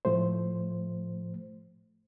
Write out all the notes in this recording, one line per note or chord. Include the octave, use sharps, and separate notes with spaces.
A2 F3 A3 C5